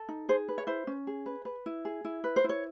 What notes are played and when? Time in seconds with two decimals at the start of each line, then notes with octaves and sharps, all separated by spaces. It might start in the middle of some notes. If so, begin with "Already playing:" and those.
Already playing: A4
0.09 D#4
0.29 G#4 C5
0.48 B4
0.58 C#5
0.67 E4 C5
0.87 C#4
1.07 G#4
1.26 B4
1.45 B4
1.66 E4
1.85 G#4
2.05 E4
2.24 B4
2.36 C5
2.44 E4
2.49 C#5